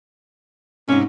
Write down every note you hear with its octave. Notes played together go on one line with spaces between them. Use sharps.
G#2 C3 C#4